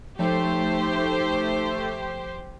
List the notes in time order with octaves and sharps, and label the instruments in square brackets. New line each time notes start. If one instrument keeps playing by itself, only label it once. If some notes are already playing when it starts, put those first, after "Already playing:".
[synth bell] F3 [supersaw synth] A3 [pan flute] D#4 [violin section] G4 C5